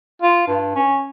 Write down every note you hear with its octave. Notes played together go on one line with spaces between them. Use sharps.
F4
G2
C#4